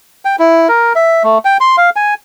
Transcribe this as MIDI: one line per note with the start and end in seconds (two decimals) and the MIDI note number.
0.25 0.36 79
0.39 0.68 64
0.69 0.93 70
0.96 1.23 76
1.24 1.38 57
1.45 1.57 79
1.61 1.76 84
1.78 1.90 77
1.96 2.14 80